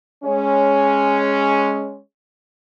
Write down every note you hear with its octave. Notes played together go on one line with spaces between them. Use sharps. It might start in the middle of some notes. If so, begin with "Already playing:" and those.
G#3 C#4